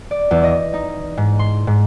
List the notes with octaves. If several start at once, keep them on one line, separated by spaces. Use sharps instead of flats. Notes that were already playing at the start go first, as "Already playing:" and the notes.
D5
E2
D#5
D#4
G#2
C6
G#2